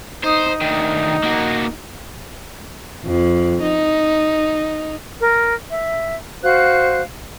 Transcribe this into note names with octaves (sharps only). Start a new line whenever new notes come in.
D#4 C5 D#6
D2 D#3 D#4
A#3 F#4
F2
D#4
A#4
E5
F#4 C5 F5 F#6